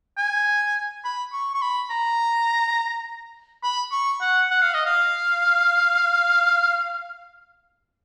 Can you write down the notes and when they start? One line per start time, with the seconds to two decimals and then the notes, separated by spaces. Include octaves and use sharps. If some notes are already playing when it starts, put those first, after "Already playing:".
0.17 G#5
1.04 B5
1.33 C#6
1.54 C#6
1.62 B5
1.90 A#5
3.63 B5
3.92 C#6
4.21 F#5
4.51 F#5
4.62 F5
4.74 D#5
4.86 F5